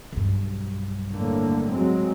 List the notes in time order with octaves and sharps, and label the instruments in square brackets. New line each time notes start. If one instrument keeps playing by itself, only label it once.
[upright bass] B1 G2
[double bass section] A2 D3 A#3
F#3 G#3 C4